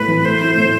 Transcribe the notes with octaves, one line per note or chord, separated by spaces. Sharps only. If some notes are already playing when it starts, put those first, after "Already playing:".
Already playing: A2 E4 B4
E3
A3 C5
E4
A2